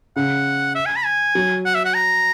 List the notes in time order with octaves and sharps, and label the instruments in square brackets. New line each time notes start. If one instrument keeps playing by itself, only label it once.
[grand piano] C#3 [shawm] F#5
[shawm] E5
G#5
B5
G#5
[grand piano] F#3
[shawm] F#5
E5
F#5
A#5